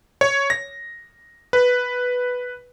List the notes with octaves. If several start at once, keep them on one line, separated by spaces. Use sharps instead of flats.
C#5
A#6
B4